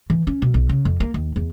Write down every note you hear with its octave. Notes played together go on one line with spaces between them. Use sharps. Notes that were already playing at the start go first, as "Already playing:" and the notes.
E3
C#4
B2
B1
C#3
F2
A#3
D#2
E2